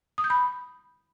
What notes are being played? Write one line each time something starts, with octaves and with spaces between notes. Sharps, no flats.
D#6
G6
B5